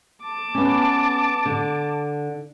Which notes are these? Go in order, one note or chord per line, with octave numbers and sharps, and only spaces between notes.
A5 D6
B3 C#4
D3